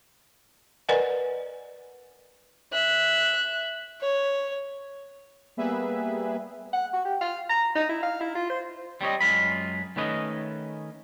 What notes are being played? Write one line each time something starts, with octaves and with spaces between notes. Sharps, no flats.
A#4 B4 D5 D#5 F#5 G#5
E5 F#6
C#5
G3 A#3 B3 G#4 B4 E5
F#5
F#4
G4
F5
A#5
D#4
E4
F5
E4
F4
C5
G3 C4 C#5 D#5
F#2 G#3 F4 B5
D#3 A3 C#4 B4 D#5